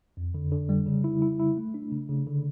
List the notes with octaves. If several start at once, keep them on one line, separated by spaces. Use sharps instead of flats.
F2
D3
D3
G3
C#3
E4
E4
E4
A3
D4
C#3
C#3
D3